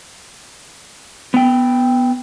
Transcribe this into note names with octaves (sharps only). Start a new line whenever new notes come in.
B3 G5